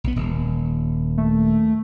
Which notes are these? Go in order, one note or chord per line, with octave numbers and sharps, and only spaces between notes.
B1 B3
D#1
A3